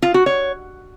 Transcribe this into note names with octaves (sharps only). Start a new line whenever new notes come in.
F4
F#4
C#5